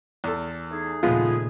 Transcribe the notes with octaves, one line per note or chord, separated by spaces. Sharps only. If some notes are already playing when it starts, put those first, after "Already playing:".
E2 A4
A3 D#4 G#4
D#2 A#2 C#3 F3 G#3 B3 F4